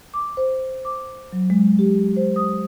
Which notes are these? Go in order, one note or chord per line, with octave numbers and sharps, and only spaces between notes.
D6
C5
D6
F#3
G#3
G4
C5
D#6